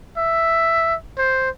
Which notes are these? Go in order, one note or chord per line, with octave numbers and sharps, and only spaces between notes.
E5
C5